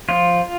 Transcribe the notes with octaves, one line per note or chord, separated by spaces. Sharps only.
F3 F4